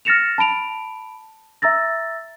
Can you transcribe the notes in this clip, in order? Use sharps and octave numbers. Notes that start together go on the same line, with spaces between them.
F6 A6 A#6 C#7 E7 F7
A5 B5 D7 F7
E5 A#5 E6 A6 A#6